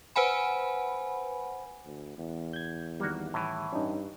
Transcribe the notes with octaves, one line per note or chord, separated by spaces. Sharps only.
B4 C5 F#5 G#5 B5
D2
E2
G6 G#6
D#3 G3 A#3 F#4
A2 E3
G2 C#4 D#4